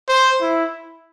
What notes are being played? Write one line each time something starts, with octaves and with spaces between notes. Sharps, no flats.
C5
E4